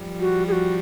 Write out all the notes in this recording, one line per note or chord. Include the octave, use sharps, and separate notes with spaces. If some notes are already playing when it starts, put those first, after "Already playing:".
Already playing: F3 G3
F#4
G#4
F#4